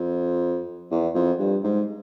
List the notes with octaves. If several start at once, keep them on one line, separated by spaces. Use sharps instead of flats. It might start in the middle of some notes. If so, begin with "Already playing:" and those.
Already playing: F2
E2
F2
G2
G#2